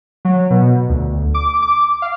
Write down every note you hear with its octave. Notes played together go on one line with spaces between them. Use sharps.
F#3
B2
D2
D6
D6
F5